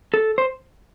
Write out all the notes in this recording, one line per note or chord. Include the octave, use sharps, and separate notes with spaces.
A4
C5